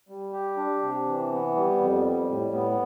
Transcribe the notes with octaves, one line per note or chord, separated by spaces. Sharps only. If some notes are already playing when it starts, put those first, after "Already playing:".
G3
G4
D4
C3
E3
B3
G3
F2
G3
A2
B3